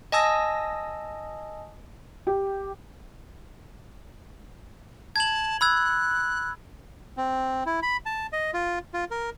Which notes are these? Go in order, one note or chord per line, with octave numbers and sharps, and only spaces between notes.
D#5 G#5 A5 D#6 E6 A#6
G4
A5 G#6 F#7
B5 E6 F#6 G#6
C4
E4
B5
A5
D#5
F4
F4
A#4